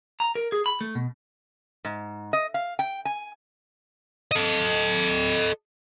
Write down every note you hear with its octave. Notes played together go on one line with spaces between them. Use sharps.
A#5
A#4
G#4
B5
A3
B2
G#2
D#5
F5
G5
G#5
A4 D#5